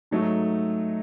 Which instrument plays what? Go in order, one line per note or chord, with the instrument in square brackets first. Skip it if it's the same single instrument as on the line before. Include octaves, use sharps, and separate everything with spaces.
[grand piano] G#2 F#3 A3 D#4 A4